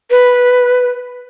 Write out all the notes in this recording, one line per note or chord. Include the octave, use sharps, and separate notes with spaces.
B4